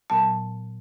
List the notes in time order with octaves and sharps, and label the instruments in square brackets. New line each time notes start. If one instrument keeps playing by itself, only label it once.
[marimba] A#2 F#3 B3 A5